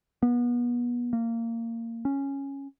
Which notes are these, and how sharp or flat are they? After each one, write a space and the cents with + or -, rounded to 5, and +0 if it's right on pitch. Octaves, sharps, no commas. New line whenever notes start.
B3 -35
A#3 -20
C#4 -5